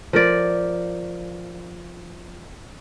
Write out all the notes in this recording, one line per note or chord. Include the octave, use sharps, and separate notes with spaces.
F3 A#4 D5